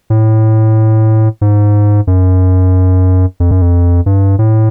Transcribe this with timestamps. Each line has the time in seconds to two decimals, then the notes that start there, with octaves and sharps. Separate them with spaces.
0.10 A2
1.41 G#2
2.07 F#2
3.40 F2
3.51 F#2
3.62 F2
4.06 G2
4.39 A2